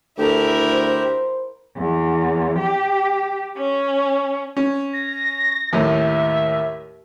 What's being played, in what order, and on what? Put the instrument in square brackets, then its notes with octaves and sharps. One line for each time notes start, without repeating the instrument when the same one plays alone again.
[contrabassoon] D2 [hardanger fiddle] E4 A#4 [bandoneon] G4 [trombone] A4
[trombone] C5
[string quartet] E2
G4
C#4
[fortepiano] C#4
[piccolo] A#6
[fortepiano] D#2 A2 [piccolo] E5